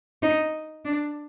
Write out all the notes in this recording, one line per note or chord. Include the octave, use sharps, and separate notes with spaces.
D#4
D4